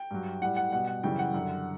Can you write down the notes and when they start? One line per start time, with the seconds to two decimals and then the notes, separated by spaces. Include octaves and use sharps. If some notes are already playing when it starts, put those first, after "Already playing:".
Already playing: G5
0.11 G2 F#3
0.42 A2 G3 F#5
0.57 F#5
0.72 B2 G3 F#5
0.87 F#5
1.04 F#2 C#3 E3 G3 G5
1.19 F#5
1.34 F#2 D3 G3